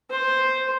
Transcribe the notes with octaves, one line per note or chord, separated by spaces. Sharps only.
C5